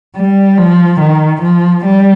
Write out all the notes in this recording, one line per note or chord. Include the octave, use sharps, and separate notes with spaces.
G3
F3
D#3
F3
G3